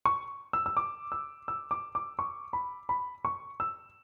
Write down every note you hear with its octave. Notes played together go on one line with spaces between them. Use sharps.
C#6
E6
E6
D6
E6
E6
D6
D6
C#6
B5
B5
C#6
E6